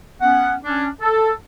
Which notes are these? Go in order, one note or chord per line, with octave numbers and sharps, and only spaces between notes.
B3 C#4 F#5
C#4 D4
A4